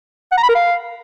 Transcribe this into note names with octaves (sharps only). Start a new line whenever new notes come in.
F#5
A#5
B5
A#4
F5